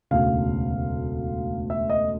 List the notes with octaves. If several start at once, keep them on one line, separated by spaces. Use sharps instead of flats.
E1 D2 C#3 F5
E5
D#5